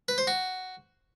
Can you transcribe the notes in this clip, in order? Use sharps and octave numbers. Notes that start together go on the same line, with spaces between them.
B4
C5
F#4